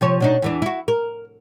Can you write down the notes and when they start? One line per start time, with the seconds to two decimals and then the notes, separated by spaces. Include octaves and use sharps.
0.01 C3 F3 C#5
0.20 B2 D4 D#4
0.42 E2 E3 D4
0.62 E4 F#4
0.88 A#4